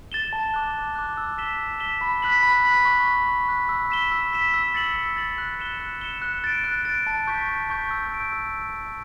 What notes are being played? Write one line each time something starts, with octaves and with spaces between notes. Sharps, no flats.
A6 E7 G7
A5
D6 F#6
A5
D6 F#6
E6
B6 E7 G7
E6
B6 E7 G7
B5
F#6 B6 F#7
B5
F#6 B6 F#7
C#6
F#6 B6
C#6
F#6 B6
E6
B6 E7 G7
E6
B6 E7 G7
E6
A6 C#7 F#7
E6
A6 C#7 F#7
F#6
C#7 E7 G7
F#6
C#7 E7 G7
F#6
A6 D7
F#6
A6 D7
A5
C#6 G6 B6
A5
C#6 G6 B6
E6
G6 D7
E6